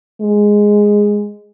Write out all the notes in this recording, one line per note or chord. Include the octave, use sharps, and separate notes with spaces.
G#3